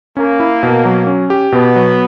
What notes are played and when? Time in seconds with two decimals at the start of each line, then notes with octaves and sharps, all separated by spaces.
0.17 A#3 C#4
0.40 E4
0.63 B2
0.85 F#3
1.07 C#4
1.30 G4
1.52 B2 B3
1.76 F#3